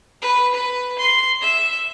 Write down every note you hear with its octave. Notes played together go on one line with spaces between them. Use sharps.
B4
B4
C6
E5